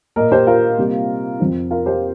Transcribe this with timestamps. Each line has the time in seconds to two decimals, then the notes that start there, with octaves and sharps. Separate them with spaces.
0.16 A#2 A#3 A#4 D#5
0.32 G4 C5
0.47 F4 A#4
0.78 C3 G3 A#3
1.40 F2 F3 C4
1.71 F4 A#4
1.86 G4 C5